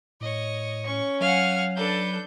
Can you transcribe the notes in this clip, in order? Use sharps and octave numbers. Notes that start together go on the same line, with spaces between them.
A2 C#5 D#5
C#4 C#6
F#3 F5 F#5 G#5 F6
D4 A4 B4 G6